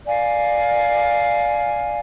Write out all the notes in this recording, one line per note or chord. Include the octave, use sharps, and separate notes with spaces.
D5 F5 G#5